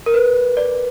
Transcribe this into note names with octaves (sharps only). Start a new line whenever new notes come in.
A#4
B4
D5